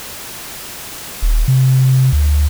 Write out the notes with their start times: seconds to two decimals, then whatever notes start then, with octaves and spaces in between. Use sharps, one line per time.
1.22 D#1
1.48 C3
2.12 D2